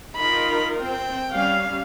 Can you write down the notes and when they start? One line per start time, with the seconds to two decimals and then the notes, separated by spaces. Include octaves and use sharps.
0.17 D#4 F4 A#4 B5
0.82 C4 G5
1.31 G3 C#4 F5